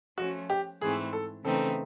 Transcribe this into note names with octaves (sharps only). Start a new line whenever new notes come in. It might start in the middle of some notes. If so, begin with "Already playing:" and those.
F3 A3 C#4 F#4
G4
G#2 E3 A3 C4 G#4
A4
C#3 E3 A3 C4 D#4 A4